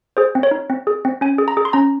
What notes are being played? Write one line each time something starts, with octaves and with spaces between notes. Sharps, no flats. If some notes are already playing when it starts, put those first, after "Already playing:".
G#4 C5
C4
C#5
D#4
C4
G#4
C4
C#4 G#5
G#4
A#5
G#4
C6
C#4 A#5